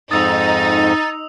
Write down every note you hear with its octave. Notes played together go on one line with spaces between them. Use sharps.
F2 G#2 D#4 D#6 E6 A6 F7